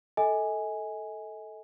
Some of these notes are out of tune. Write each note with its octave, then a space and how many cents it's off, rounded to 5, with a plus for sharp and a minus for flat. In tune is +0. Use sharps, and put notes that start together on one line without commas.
A4 +0 D#5 +40 G#5 +0